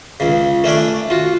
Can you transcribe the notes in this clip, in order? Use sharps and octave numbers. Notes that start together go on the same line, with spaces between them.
C#2 C#3
A3 C#4 D4 D5
F4 F#4